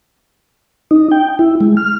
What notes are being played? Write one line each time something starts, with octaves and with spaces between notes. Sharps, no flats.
D#4
G5
E4
G#3
F6